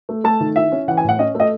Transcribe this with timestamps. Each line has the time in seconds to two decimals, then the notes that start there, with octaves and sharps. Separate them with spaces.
0.09 A3
0.24 A3 A5
0.40 D#3
0.56 E4 E5
0.72 C#4
0.88 E3 F#5
0.97 G#5
1.04 A2 F#5
1.19 C#4 D#5
1.35 A3 D#5